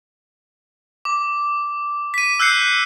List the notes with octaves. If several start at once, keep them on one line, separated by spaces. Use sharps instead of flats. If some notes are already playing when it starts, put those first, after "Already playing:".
D6
B6 D#7
E6 F#6 G6 C7 C#7